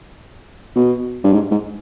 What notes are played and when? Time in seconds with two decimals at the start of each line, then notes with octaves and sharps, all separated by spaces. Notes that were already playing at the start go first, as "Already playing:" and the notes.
0.76 B2
1.24 G2
1.33 G#2
1.51 G#2